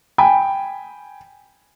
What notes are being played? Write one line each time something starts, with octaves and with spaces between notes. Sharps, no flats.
G5 G#5 B5